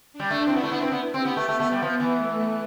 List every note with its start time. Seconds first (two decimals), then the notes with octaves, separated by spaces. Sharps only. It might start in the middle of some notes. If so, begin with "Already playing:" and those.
0.13 D4
0.20 G3
0.30 A3
0.47 C4 E4
0.55 B3
0.63 A3
0.72 B3
0.81 C4
0.92 B3
1.14 C4 G4
1.25 B3
1.37 A3
1.48 A3 B3
1.60 A3
1.72 G3
1.82 F3
2.00 E3
2.16 A3